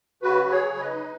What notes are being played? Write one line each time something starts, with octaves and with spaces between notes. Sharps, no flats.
C#3 F#4 B4
F#3
G#4 C#5
C#3
B4 D#5
D#4